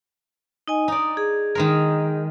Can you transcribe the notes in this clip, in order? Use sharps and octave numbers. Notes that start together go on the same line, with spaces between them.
D#4 D#5 G#5
D#4 D5 D#6
G#4
D#3 G#3 A#4